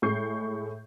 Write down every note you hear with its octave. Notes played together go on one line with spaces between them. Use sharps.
A2 G#3 C#6 G6 C7